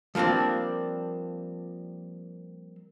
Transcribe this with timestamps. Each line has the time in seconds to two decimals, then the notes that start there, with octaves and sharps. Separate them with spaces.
0.15 F3 G3 A#3 C4 D4